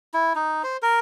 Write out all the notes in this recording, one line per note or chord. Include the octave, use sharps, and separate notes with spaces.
E4
D#4
C5
A#4